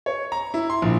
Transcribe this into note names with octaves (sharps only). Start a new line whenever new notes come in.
C#5
A#5
E4
C6
A#1